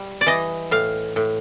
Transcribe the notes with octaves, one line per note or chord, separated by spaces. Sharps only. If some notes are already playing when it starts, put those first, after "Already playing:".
Already playing: G3
D5
E3 D#5
A2 F5
A2